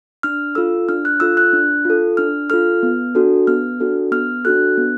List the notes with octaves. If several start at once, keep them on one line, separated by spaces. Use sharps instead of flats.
D4 F6
F4 A4 E6
D4 F6
F#6
F4 A4 E6
F#6
D4
F4 A4
D4 F6
F4 A4 F6
B3
D4 F#4 A4
B3 F6
D4 F#4 A4
B3 F6
D4 F#4 A4 F#6
B3